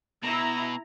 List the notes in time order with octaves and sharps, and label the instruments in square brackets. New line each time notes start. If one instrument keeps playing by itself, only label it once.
[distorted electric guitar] B2 [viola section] E4 A#5